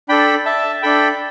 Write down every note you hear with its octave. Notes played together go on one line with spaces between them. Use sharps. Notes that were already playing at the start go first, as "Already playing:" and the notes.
D4 A4 G5 B5
E5 A5
D4 A4 G5 B5